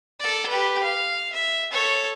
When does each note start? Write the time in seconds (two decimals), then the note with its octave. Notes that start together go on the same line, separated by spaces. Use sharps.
0.20 A4 D5
0.49 G4 B4
0.83 F5
1.32 E5
1.72 A4 C#5